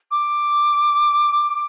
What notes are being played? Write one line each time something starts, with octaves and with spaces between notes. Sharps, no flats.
D6